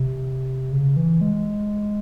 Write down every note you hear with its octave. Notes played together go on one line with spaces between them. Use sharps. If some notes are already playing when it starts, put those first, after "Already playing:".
Already playing: C3
C#3
E3
G#3